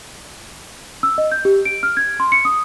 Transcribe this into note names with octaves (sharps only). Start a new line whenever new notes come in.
E6
D#5
G6
G4
D7
F6
G#6
C6
C#7
D#6